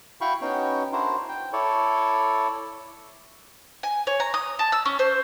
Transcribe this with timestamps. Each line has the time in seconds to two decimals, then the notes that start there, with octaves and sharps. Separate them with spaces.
0.21 E4 F#4 F5 G5 B5 C#6
0.41 B3 C#4 D#4 F#4 G5
0.93 D4 E4 F#4 A#4 C5
1.29 G5
1.53 E4 A4 C#5 D5
3.83 G#5
4.07 C#5
4.20 A#5
4.34 D#6
4.59 A5
4.72 E6
4.85 C#4
4.99 C5